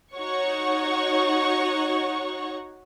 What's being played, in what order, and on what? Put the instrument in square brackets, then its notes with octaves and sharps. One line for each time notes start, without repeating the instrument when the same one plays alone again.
[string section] D#4 F#4 C#5 F#5 C#6